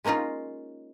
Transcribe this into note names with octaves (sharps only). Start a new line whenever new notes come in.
G#3 A#3 C#4 D#4 F4